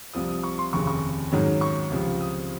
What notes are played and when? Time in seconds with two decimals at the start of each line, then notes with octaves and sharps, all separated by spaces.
0.14 C2 C3 F3 D#6
0.29 D#6
0.43 C#6
0.58 C6
0.73 F1 D#2 C#3 C#6
0.87 C#6
1.32 G#2 D#3 F#3 C#4
1.61 C#6
1.91 C#2 C3 F3
2.21 D#6